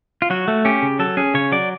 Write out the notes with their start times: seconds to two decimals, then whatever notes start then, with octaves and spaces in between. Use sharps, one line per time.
0.22 F4
0.30 F#3 F#4
0.48 A3
0.65 C#4 G4
0.82 C#3
0.99 F#3 A4
1.17 C#4 G#4
1.34 C#3 C#5
1.52 F#3 D5